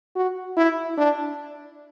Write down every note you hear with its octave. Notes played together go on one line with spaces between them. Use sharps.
F#4
E4
D4